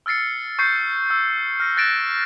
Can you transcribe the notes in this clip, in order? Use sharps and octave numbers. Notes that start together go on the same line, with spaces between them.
E6 F6 A6 C7 C#7
C#6 G6 C7 C#7
E6
F6 A#6 C#7
F#6 A6 A#6 D7 E7